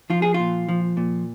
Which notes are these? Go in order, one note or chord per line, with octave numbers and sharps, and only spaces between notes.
F3 F4
G#4
F4
A#2
F3
A#2